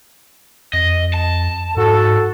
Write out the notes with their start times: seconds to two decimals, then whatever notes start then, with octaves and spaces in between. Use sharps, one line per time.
0.73 F2 D#5
1.14 A5
1.77 G#2 F#4 A4